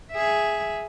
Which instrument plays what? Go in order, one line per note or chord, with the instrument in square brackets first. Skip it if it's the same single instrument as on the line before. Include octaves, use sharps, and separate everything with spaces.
[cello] G#4 E5